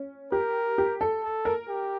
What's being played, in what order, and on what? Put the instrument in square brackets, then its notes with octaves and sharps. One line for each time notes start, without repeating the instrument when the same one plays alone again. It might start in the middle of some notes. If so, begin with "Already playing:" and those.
Already playing: [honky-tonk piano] C#4
[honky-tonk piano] G4 [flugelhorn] A#4
[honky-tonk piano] G4
A4
[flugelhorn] A4
[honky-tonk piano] A#4
[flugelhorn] G4